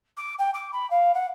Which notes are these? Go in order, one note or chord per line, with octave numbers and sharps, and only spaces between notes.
D6
G5
D6
B5
F5
F#5